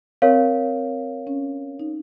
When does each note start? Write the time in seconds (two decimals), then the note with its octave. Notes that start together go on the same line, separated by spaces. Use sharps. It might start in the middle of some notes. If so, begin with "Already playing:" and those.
0.22 C4 A#4 C#5 F5
1.27 C#4
1.79 D#4